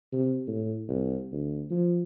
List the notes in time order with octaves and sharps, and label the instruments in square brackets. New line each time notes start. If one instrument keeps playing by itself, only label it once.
[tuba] C3
A2
C2
D2
F3